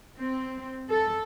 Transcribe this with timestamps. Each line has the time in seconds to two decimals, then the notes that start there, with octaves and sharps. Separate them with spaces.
0.18 C4
0.91 A4